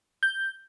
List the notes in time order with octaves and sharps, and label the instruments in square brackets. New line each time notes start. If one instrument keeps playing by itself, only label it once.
[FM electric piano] G6